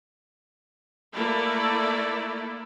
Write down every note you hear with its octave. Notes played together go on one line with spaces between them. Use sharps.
A3 A#3 E4 A4 D5